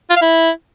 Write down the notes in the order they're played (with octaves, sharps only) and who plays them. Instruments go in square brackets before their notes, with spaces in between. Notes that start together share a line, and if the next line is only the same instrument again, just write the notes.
[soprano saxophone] F4
F5
E4